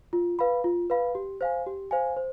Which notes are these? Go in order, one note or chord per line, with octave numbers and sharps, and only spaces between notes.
F4
B4 F5 B5
F4
B4 F5 B5
G4
C5 F5 G#5
G4
C5 F5 G#5
C5